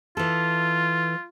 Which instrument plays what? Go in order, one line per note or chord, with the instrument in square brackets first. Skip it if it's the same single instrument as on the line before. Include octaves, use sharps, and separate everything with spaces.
[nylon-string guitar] E3 A4 [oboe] F4